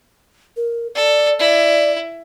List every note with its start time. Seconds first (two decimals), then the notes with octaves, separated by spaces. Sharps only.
0.57 A#4
0.95 A4 D5
1.39 E4 D5